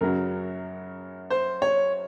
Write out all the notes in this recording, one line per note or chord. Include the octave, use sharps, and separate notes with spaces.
F#2 C#3 F#3 A#4
C5
C#5